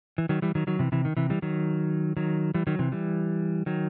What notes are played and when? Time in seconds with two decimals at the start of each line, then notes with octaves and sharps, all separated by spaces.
0.18 E3
0.29 D#3 F#3
0.42 E3 G3
0.55 D#3 F#3
0.67 D#3 F#3
0.79 C3 E3
0.92 C3 E3
1.05 D#3
1.17 C3 E3
1.30 E3 G3
1.42 D#3 F#3
2.17 D#3 F#3
2.54 E3 G3
2.67 D#3 F#3
2.79 C3 E3
2.92 E3 G3
3.66 D#3 F#3